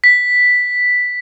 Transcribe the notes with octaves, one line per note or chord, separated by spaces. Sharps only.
B6